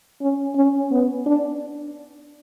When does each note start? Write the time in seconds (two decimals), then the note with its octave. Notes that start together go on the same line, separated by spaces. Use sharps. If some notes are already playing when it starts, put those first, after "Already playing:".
0.22 C#4
0.56 C#4
0.91 B3
1.26 D4